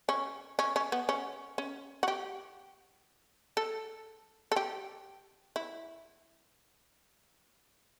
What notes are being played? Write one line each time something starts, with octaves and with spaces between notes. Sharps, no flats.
C#4
C#4
C#4
B3
C#4
C#4
F#4
G4
A4
A4
G4
E4